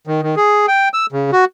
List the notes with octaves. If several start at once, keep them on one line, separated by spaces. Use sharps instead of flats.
D#3
D#3
G#4
G5
E6
C#3
F#4